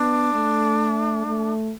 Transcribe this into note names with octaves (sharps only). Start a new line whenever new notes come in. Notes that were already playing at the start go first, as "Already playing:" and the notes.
Already playing: B3 D4
A3
A3